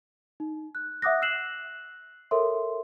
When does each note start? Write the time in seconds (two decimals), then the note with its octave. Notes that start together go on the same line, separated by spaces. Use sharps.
0.40 D#4
0.75 F#6
1.02 E5 F#5 D6 D#6 F#6 A#6
1.22 E6 F#6 C7 E7 F#7
2.31 A4 A#4 C#5 E5 C6